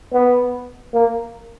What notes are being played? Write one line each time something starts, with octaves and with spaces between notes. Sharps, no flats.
B3
A#3